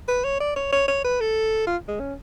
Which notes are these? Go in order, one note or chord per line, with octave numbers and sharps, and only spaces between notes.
B4
C#5
D5
C#5
C#5
C#5
B4
A4
F4
G#3
C#4